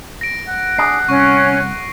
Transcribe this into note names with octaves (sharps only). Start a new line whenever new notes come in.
A#6 D7
F#5
D4 G#4 C7
C2 C#4 C#6